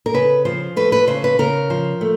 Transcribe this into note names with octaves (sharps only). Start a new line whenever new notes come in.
A#4
C#3 B4
F3 C5
A3 B4
B4
C#3 C5
B4
C#3 A#4
F3
A3